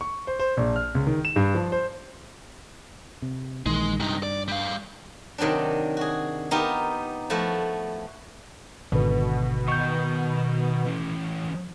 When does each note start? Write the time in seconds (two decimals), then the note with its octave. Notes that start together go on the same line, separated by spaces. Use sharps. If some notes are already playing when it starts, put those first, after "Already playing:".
0.01 C#6
0.27 C5
0.40 C5
0.57 A#1
0.76 F6
0.95 C#2
1.07 D#3
1.25 E7
1.36 G2
1.55 F3
1.72 C5
3.22 C3
3.66 A#1 D#3 E3 G#3
4.00 G2 C3 D#4
4.23 D5
4.48 G3 F5
5.38 C3 D#3 F#3 C4 D4
5.97 F#4 G#4
6.51 B3 D#4 F4 G4 A#4
7.30 F3 A3 E4 F#4
8.92 G#1 B2 D3 B4
9.68 D#3 D#5 C#6 G6
10.85 E3 C#4